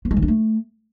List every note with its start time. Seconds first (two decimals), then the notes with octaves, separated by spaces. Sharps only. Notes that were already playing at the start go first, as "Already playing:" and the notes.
0.05 B3
0.11 G#3
0.17 D#3
0.22 D4
0.28 A3